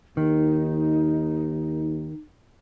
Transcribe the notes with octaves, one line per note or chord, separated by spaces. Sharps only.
D#2 D#3 D#4